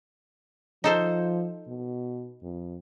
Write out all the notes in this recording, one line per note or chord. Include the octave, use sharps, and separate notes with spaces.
F3 D#4 A4 C5
B2
F2